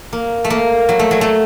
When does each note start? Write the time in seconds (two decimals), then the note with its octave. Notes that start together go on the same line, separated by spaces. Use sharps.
0.13 A#3
0.44 A3
0.50 A#3
0.89 F#3
0.99 A3
1.11 F#3
1.21 A3